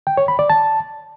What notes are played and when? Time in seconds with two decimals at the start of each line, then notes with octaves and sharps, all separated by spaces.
0.07 G5
0.17 C#5
0.28 B5
0.39 D5
0.50 A5